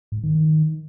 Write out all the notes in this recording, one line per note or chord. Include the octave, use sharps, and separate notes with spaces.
G#2
D#3
D#3